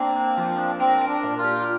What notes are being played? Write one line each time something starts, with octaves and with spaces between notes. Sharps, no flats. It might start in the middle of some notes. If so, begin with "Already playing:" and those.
Already playing: A#3 C4 D4
D4
F3
D4
C4 A#4
A#4
D4
A#2
F4
G4